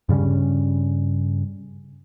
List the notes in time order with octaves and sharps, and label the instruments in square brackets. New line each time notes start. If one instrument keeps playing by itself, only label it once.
[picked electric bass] G2 C#3 G3 C#4